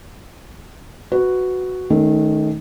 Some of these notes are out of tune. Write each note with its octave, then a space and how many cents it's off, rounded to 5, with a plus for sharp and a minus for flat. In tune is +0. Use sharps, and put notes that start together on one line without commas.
F#4 +0 B4 +10
D#3 +0 A3 -25 C#4 +20